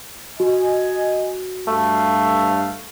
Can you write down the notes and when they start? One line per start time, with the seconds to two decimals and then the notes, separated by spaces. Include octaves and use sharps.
0.40 F#4 D#5 G#5
1.67 G2 A3 F5